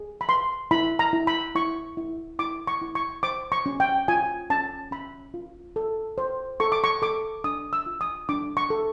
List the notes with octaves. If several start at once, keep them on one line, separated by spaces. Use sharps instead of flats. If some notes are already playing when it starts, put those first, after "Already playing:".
Already playing: G#4
B5
B4 C6
E4 B5
A#5
E4
B5
E4 C#6
E4
E4 D6
C#6
E4
C#6
C5 D6
C#6
C#4
G5
F4 G#5
C#4 A5
C#4 B5
F4
A4
C5
A4 C#6
D6
C#6
A4 D6
D4 D#6
E6
F4
D#6
D4 D6
C#6
A4